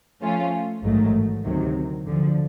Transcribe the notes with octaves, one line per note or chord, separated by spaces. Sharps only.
F3 A3 C#4 F4
A1 G#2 D#3 F#3 A3
D2 C3 D#3 F#3
D2 D3 F3